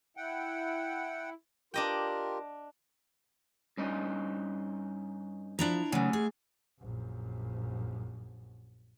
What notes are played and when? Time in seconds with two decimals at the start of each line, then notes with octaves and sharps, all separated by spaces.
0.17 E4 F#5 G5
1.74 D4 F4 G4 A#4 D#5 G5
3.77 G2 C#4 D#4
5.59 F3 D4 E4 A#5
5.92 C#3 F#3 A3 F#5 G#5
6.13 G#4
6.81 A#1 F#2